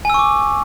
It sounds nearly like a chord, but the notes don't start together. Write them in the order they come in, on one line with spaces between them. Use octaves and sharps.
G#5 E6 C#6 D6